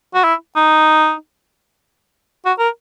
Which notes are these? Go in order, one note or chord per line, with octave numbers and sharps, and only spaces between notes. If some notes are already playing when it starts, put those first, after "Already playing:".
F#4
E4
D#4
F#4
A#4